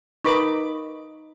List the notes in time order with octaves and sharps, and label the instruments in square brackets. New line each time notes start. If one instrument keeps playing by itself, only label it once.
[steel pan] D#4 B5 D6 [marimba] A#4 B4 C#6